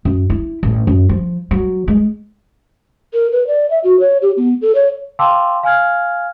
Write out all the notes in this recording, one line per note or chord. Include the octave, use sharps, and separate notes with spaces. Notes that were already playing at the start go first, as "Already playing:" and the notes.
F#2
E4
A1
F#2
F3
F#3
G#3
A#4
B4
D5
E5
F#4
C#5
G4
B3
A4
C#5
F5 G5 A5 C6 D6 E6
F5 G#5 F6 G#6